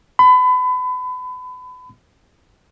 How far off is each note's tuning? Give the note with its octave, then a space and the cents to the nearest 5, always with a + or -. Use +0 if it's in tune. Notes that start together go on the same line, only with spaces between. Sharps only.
B5 +30